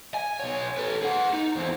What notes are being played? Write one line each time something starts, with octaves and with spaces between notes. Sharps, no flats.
G#5
B1 C#5
A4 B4
G#4 F#5
D#4
E2 C4